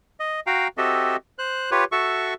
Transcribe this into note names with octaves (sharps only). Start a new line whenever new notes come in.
D#5
F#4 F5 G5 A#5
C4 F#4 G4 A4 D#5 E5
C5 F#6
F4 G4 B4 C#5
F#4 A4 E5 C#6